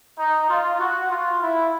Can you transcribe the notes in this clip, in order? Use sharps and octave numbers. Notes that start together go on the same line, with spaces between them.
D#4
F4
F#4
F4
E4